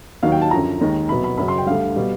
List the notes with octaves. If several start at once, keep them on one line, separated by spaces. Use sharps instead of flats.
D#2 D#3 F#3 F5
G5
A5
F#2 D3 F3 A#5
D#2 D#3 G#3
C2 B2 F#3 B5
B5
F#2 C#3 F#3 B5
C6
G5
D2 D3 G3 F5
B2 G3